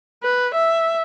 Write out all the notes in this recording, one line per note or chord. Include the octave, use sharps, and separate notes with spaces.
B4
E5